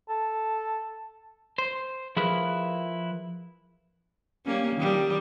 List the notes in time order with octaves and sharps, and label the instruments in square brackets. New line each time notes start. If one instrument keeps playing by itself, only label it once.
[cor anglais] A4
[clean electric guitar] C5
F3 E4 G#4 A#4 B4
[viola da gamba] G3 A#3 C#4
D#3 G3